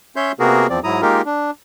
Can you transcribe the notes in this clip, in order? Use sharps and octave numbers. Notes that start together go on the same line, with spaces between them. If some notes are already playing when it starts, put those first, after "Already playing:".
C#4 C#5 E5 C6 G6
C3 A#3 B3 F#4 G#4 A#4
E2 F3 C4 D5
G#2 F#3 E4 A#5 D#6
G#3 A#3 D#4 F4 G4 A#4
D4